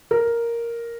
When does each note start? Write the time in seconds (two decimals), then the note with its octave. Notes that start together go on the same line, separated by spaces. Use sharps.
0.11 A#4